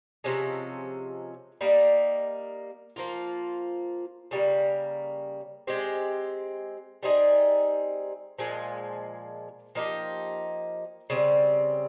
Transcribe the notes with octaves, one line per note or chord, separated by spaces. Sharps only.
C3 F3 G#3 C#4
G3 A#3 D#4
F3 A#3 F4
C#3 G3 A#3
G#3 C4 G4
G3 C4 D#4 G#4
A#2 F3 G#3
F3 A#3 D#4 G4
C#3 G3 C4